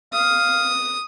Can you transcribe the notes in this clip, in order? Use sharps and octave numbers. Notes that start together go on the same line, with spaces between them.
F5 D#6